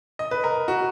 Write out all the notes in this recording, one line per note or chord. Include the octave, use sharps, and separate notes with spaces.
D#5
B4
A#4
F#4